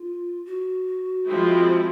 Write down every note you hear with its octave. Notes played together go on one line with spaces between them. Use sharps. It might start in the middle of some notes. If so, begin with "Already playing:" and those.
Already playing: F4
F#4
F3 G#3 C4 E4